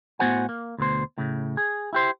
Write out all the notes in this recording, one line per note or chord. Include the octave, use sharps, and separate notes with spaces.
A2 B3 F#4 C5 F#5 G#5
A#3
D2 B2 C5
A2 C#3
G#4
E4 G4 C5